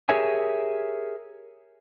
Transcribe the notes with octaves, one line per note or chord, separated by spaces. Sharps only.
G4 G#4 A#4 C#5 E5 G#5